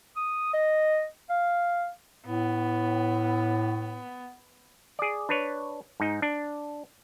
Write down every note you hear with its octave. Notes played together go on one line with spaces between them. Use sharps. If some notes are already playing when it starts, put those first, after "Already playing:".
D#6
D#5
F5
A2 B3
G#4 D5
D4 B4 C#5
G#2 D#4
D4